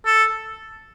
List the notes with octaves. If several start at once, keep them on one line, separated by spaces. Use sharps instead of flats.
A4